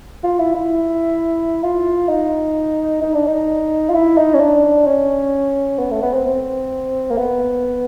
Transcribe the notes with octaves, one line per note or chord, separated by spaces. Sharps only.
F4
E4
E4
F4
D#4
D#4
D4
D#4
F4
E4
D#4
C#4
D4
C#4
B3
A3
B3
C4
C4
A#3
B3